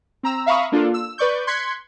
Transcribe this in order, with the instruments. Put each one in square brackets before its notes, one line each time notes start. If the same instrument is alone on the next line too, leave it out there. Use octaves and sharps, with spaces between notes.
[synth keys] C4 A#5 E6
E5 F5 A#5 B5 C#6 D#6
A#3 D4 F4 A4
E6
B4 D5 C#6 G6
C6 F#6 G#6 B6 C#7